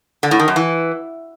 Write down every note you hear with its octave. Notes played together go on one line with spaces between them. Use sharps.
D3
A2
D#3
F#2
E3